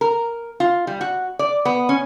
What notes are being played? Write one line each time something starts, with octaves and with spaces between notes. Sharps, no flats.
A#4
F4
G3
F#4
D5
B3
C#4